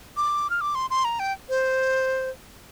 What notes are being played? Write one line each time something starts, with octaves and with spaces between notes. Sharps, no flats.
D6
F6
D6
C6
C6
A#5
G5
C5